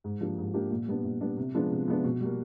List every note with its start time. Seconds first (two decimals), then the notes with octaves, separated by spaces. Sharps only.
0.04 G#2
0.20 F3 A#3 D4 G4
0.38 G#2
0.54 F3 A#3 D4 G4
0.71 A#2
0.88 G3 B3 D4
1.04 A#2
1.21 G3 B3 D4
1.37 C3
1.54 F3 G#3 B3 D4
1.71 C3
1.88 F3 G#3 B3 D4
2.04 B2
2.21 G3 A#3